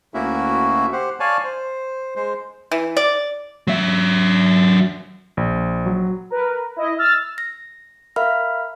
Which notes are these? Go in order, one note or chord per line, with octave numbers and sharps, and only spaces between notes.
D2 A#3 C#4 E4 F#4 E5
G4 C5 F#5
C#5 D5 F5 G#5 A5
C5
G#3 C5
E3
D5
F#3 E5
A#1
F#3
A#4 B4
E4 D#5
E6 F6 A6
A#6
A#4 E5 F5 B5 F6